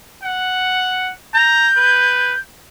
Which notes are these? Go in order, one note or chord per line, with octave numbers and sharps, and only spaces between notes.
F#5
A#5 G6
B4